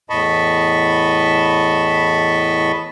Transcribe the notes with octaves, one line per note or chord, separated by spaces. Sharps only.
E2 A2 D#5 A5 B5 C#6